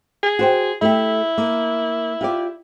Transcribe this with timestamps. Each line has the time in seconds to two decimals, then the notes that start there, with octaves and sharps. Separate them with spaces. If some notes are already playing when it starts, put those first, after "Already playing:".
0.23 G#4
0.39 F#4 C5 G5
0.82 A3 E4 G4
1.38 A#3
2.21 F4 G4 D5